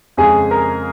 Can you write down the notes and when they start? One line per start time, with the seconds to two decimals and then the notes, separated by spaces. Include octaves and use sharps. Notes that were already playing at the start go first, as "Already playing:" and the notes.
0.17 F2 C#3 G#3 G#4 G#5
0.51 A#4 A#5